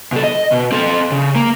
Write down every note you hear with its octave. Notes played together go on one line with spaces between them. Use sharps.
B2 A4
D#5
B2
C4 A4
C#3
A#3